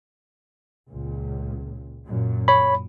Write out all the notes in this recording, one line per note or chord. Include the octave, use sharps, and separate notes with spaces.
C#2 A#2
F#2 A#2
C#5 B5